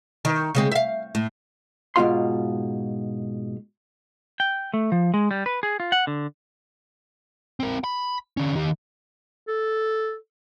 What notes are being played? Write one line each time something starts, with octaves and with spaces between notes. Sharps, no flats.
D#3
C#3 G#3 C4
E5 F5
A2
G#2 B2 D#4 F4 F5 C6
G5
A3
F3
G#3
G3
B4
G#4
F4
F#5
D3
C4 A#4
B5
D3 C#4
D#3 G4
A4